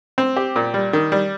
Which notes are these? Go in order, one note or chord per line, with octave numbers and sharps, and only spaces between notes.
C4
G4
A#2
G3
D#3
G3